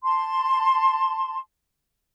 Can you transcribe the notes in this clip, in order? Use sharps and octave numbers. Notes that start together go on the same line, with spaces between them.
A5 C6